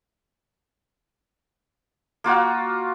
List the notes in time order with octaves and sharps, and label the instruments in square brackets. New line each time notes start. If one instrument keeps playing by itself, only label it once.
[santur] A#3 F4 F#4